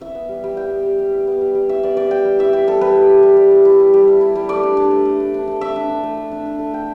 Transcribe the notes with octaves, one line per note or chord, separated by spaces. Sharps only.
E4 E5
B3
G3
G3
E4 G5
B3
G3
G3
E4
B3
G3
G3
E4 E5
B3 D5
G3 D5
G3 G5
G3
E4 E5
E4 G4
G3 A4
G3 B4
E4
E4
G3
G3
E4
E4
G3
G3
E4
E4
G3
A3 D5
D4
D4
A3
A3
D4
D4
A3
A3 E5
D4
D4
A3
A3
D4
D4
A3
A3 G5